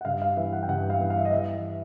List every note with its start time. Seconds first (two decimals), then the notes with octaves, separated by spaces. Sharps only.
0.01 F#5
0.05 G2 F5
0.22 F5
0.37 E3 E5
0.53 F#5
0.63 G5
0.68 G2 F#5
0.90 F5
1.00 E3
1.10 F5
1.18 E5
1.25 D#5
1.32 E3 E5